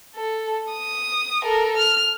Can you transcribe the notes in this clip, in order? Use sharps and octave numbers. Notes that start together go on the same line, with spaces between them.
A4
D#6
A4 A#4
F6